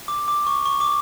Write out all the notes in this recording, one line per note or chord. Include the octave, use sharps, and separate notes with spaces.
D6
D6
C#6
C#6
D6